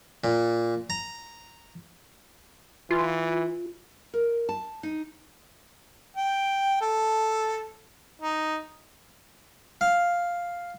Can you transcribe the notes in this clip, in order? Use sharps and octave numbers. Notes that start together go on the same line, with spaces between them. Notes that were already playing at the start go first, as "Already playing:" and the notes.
A#2
A#5
E3 F4
A#4
A5
D#4
G5
A4
D#4
F5